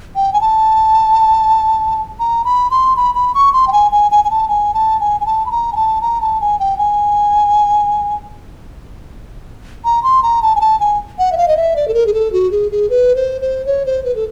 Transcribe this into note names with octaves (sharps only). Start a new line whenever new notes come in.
G5
G#5
A5
A#5
B5
C6
B5
B5
C#6
C6
G5
G#5
G#5
G#5
G#5
A5
G#5
A5
G#5
G#5
A5
B5
A#5
G#5
A5
A#5
A5
G#5
G5
G#5
A#5
C6
A#5
A5
G#5
A5
G#5
F#5
E5
F5
D#5
E5
D5
A4
A#4
G#4
A4
F#4
G#4
G#4
B4
C5
C5
C#5
C5
B4
A4